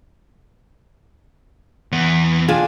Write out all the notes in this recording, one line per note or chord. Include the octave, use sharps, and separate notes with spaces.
E2 B3
D4 F4 G#4